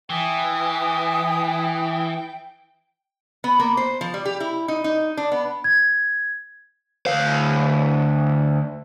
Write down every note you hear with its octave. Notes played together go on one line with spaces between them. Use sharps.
E3 E5 G5 G#5 D#6
B3
A#3
C5
F3
G3
G4
E4
D#4
D#4
D4
B3
G#6
D2 F5